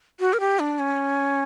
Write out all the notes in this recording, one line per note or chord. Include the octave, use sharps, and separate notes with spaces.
F#4
A#4
G4
D4
C#4